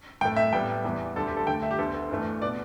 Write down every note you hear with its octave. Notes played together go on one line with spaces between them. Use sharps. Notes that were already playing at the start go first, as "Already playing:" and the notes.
A2 A3 G5
E5
A2 G3 B3 G5
E2 E3 G3 B3
D2 D3 G3 A4
G4
A4
D2 D3 A3 G5
E5
G4
D2 D3 B3 A4
A4
G2 E3 A3
B2 B3 D5